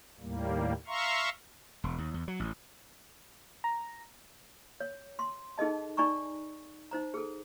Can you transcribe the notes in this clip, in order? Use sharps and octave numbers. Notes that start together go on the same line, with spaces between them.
D#2 A2 G3 A#3
E5 F5 A#5 C6 C#6
E1
D#2
E2
F#3
A1
A#5
C#5
C6
D#4 G#4 A4 D#5 A5
D#4 D5 G#5 A#5 C#6
D#4 C5 A#5
G#4 A4